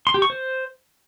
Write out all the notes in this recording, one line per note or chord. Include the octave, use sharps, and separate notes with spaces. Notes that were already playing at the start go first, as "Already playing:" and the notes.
C6
G4
C#6
C5